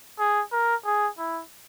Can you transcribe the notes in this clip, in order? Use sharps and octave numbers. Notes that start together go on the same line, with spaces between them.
G#4
A#4
G#4
E4